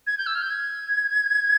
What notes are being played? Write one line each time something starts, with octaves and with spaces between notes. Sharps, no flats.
G#6
G6
E6
F6
G6
G#6